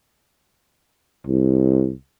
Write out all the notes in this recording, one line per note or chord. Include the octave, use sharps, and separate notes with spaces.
C2